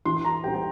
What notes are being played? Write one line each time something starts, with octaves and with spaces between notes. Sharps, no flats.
E3 C6
C6
A#5
G3 C4 G5
G5